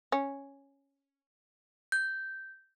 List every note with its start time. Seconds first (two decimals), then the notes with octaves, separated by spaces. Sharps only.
0.12 C#4
1.92 G6